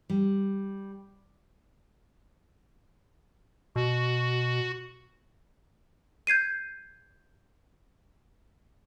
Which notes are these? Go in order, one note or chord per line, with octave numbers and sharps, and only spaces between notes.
G3
B2 F#4
G6 G#6 C7 D#7